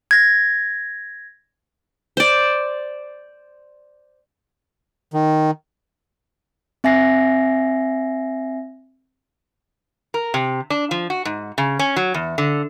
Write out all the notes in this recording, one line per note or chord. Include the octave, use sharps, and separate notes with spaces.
G#6 A#6
C5 D5
D#3
C4 E5 G#5 A#6 C7
A#4
C3
D4
F3
F#4
G#2
C#3
C#4
F#3
E2
D3